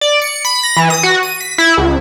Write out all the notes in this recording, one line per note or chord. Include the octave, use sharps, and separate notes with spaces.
D5
C#7
B5
A#6
E3
D#6
F#4
D#7
B6
E4
C#2